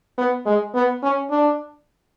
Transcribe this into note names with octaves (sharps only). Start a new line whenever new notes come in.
B3
G#3
B3
C#4
D4